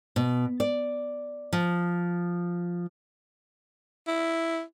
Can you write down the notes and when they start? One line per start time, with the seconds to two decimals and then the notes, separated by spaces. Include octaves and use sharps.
0.16 B2
0.60 D5
1.53 F3
4.07 E4